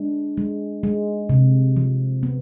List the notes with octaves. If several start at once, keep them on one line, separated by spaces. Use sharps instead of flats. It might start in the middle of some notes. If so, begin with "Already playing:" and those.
Already playing: G#3 D4
G#3
G#3
C3
F3
B3